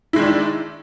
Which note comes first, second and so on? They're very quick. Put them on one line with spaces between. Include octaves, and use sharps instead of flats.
E4 G#3 D#3 D4